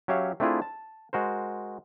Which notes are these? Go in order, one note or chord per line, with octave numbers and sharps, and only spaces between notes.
F#3 C#4 G4 C#5 E5 F5
A3 C4 D4 E4 F4 G#4
A5
G#3 F#4 A#4 C5